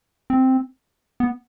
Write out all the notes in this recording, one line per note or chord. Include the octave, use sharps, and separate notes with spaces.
C4
B3